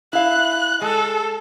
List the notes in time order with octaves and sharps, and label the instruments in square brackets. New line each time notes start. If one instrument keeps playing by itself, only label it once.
[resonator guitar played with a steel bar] E4 F5 [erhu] F#6
[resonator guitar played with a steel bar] G#3 [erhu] A4